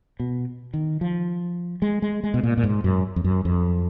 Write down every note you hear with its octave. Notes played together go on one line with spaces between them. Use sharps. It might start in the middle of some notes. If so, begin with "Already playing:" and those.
B2
D#3
F3
G#3
G#3
G#3
B2
A#2
A#2
G#2
F#2
F2
F#2
F2